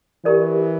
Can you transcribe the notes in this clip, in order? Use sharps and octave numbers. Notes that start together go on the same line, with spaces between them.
E3 G4 A#4 D5